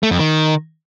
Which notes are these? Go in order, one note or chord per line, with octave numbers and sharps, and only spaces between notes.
A3
F2
D#3